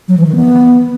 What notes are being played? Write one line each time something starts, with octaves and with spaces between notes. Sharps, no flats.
F#3
E3
D#3
B3